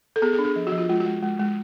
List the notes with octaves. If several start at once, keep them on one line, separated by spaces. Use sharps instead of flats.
A4
B3 G#4
G#4
D4
G#4
F3
F#4
F3
F4
G#3 F4
F#4
G#3
G#3
G#3